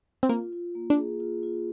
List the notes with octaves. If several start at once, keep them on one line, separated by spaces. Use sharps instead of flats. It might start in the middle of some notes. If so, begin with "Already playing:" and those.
C4
A#3 F4
F4
A#3
D4
G#4
F4
F4